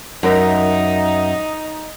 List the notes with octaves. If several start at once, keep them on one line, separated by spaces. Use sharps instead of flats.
F#2 D#4 A#4 E5